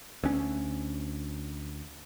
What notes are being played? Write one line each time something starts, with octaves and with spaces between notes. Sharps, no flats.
D2 C#4